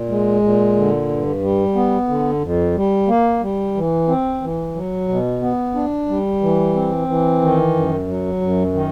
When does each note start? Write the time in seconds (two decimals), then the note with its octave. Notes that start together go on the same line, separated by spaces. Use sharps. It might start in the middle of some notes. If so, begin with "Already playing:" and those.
Already playing: A#2
0.09 G#3
0.42 A#2
0.76 D3
1.08 G2
1.42 G3
1.75 B3
2.08 D3
2.42 F2
2.76 G3
3.08 A#3
3.42 G3
3.76 E3
4.08 C4
4.42 E3
4.75 F#3
5.08 B2
5.42 B3
5.75 D4
6.08 G3
6.42 E3
6.75 C4
7.08 E3
7.41 D#3
7.75 F#2
8.08 F#3
8.41 F#2
8.74 D#3